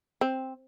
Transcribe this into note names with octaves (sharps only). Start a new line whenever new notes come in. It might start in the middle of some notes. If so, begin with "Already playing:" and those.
C4